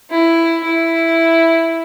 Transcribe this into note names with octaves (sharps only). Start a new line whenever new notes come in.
E4
E4